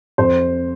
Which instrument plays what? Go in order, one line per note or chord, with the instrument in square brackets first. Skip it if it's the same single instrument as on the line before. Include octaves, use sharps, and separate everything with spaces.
[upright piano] F2 C5